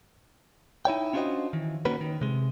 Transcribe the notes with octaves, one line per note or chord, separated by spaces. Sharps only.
D#4 E4 C#5 G5
C#4 D4 F4 F#4 C5 D#5
D#3 E3
D#3 A#3 C#4 F#4 B4
D#3
C3 G#3